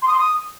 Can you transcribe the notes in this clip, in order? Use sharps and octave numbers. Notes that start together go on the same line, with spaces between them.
C6
D#6
C6
D#6